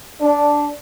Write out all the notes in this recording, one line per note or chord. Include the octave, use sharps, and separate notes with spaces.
D4